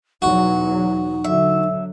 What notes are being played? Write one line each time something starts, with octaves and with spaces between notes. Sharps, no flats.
E2 B2 F#3 D#4 F#4
D3 F#3 E5